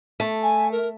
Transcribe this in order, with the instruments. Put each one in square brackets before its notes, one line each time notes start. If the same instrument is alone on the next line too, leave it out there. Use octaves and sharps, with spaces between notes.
[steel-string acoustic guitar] A3
[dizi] G#5
A#4